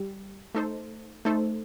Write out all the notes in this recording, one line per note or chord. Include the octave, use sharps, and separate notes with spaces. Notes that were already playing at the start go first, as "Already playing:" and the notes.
Already playing: G3 G4
A3 D#4 A4 C5
A3 D#4 A4 C5